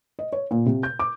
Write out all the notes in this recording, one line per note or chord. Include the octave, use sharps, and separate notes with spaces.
D#5
C#5
A#2
C3
G6
D6